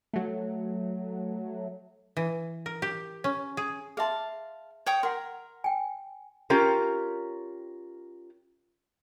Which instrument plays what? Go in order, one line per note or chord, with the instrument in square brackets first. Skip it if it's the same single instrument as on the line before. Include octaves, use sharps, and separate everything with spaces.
[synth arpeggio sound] F#3 A3
[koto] E3
A#4
G4
C#4
G#4
[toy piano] G#4 E5 C6 [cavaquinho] F5 A5
[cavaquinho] C#5 G5 D#6
[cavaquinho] A#4 [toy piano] F#5 C6
[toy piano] G5 G#5
[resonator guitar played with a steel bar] C#4 F4 G4 A#4